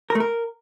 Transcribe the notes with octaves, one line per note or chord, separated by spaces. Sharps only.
A#4
A3
A#4